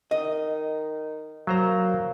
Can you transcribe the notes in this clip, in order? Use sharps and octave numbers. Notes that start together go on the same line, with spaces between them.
D#3 D#5
F#3 A#3 C5 A#5